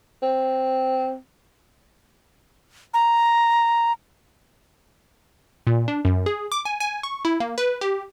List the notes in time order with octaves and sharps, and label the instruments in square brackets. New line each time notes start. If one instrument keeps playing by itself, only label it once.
[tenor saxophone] C4
[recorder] A#5
[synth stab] A#2
D4
F#2
G#4
D6
G#5
G#5
C#6
E4
A#3
B4
G4